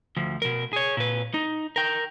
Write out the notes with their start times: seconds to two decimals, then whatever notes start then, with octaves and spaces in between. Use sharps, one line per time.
0.17 D2 F3
0.42 B2 A#4
0.73 G#4 C#5
0.97 A#2 B4
1.34 D#4
1.76 A#4 G5